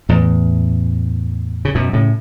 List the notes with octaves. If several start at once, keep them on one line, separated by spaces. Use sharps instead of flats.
E2 A2
C#3
F#2 B2
A2 C#3